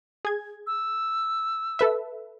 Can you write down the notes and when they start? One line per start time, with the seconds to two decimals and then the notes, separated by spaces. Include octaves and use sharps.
0.25 G#4 G#6
0.67 E6
1.79 A4 B4 E5